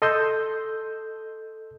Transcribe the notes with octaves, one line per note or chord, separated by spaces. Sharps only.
A4 D#5 C6 E6 G6